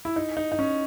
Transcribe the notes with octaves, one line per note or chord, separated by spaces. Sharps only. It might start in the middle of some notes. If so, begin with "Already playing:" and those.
E4
D#4
D#4
D#4
C#4